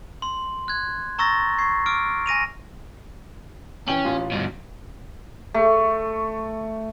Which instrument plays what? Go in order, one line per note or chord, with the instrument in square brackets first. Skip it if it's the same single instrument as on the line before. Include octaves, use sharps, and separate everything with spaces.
[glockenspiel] C6
F#6 G#6
A#5 C#6 E6 A6 A#6
C#6 G#6 C7
D6 E6 F6 D7
G#5 A#6 D#7 F7
[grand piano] E3 G5 F#7 [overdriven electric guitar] C#4
[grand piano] A1 F4
[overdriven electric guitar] G2 B2
[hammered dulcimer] A3